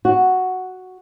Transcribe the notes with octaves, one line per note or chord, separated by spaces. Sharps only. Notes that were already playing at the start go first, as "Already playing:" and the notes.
F#4